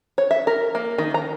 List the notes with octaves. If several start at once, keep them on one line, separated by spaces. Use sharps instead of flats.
C#5
E5
A#4
A#3
D#3
A#5